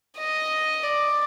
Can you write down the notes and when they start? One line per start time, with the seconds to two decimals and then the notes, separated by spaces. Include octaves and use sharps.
0.19 D#5
0.83 D5